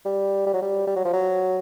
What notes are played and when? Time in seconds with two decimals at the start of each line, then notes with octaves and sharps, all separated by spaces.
0.05 G3
0.46 G3
0.54 F#3
0.62 G3
0.87 G3
0.96 F#3
1.05 F3
1.13 F#3